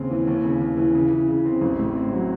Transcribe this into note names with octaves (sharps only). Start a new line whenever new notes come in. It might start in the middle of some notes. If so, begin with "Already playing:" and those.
Already playing: D#2 C#3 C4
E3
D#2
C#3
D#2
E3
C#3
E3
C#3
C4
A1
A2
C4
F#3